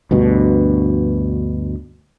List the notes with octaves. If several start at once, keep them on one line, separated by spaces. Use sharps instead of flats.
D2 G2 B2